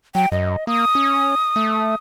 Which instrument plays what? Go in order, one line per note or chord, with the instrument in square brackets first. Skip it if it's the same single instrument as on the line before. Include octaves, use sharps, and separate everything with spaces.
[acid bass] F#3 [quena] G5
[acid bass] F#2 [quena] D#5
[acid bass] A#3 [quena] D#6
[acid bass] C#4
A3